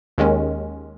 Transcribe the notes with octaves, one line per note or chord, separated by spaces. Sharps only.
D#2 D#3 G#3 C#4